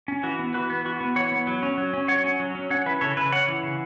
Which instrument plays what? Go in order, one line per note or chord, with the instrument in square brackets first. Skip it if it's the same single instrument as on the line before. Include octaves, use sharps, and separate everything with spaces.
[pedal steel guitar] C#4
E3 F#4
B3
E3 F#4 B4
B3
E3 F#4
B3
E3 C#5 F#5
B3
F#3
C#4
F#3
C#4
F#3 C#5 F#5
C#4
F#3
C#4
C#4 C#5 F#5
E3 B4 E5
C#3 A4 C#5
C#3 B4 E5
C#4 C#5 F#5
E3
C#3